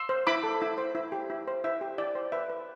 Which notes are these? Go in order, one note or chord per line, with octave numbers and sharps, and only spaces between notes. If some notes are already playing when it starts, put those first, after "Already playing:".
Already playing: C6 E6
C5
E4 B5 D6
A4
E4
C5
E4
G4
E4
C5
E4 E5
G4
E4 D5
C5
B4 E5
B4